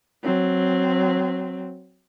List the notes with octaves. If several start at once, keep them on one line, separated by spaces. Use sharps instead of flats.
F#3 C4